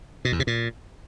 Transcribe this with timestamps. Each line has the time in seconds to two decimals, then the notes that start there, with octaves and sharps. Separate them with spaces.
0.25 B2
0.32 E2
0.40 C3
0.47 A#2